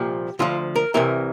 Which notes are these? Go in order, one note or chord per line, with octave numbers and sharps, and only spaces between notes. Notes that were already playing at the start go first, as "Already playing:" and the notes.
Already playing: C2 A#2 F3 G4
D2 D3 F3 F4
A#4
C2 C3 E3 A#4